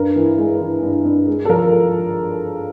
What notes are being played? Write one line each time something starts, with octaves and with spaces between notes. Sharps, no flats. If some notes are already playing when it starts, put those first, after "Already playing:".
Already playing: G2 A#4
E3
G#3
E3
G2
G2
G#3
A4
F3 A#4